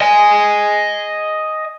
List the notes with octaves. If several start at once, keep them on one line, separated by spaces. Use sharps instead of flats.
D#5 G#5